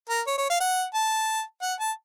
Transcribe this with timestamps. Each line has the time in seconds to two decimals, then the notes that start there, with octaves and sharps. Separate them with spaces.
0.09 A#4
0.27 C#5
0.38 C#5
0.50 F5
0.60 F#5
0.94 A5
1.62 F#5
1.80 A5